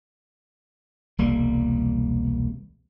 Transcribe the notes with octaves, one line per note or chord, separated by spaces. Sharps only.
E1 C2 G3 A#3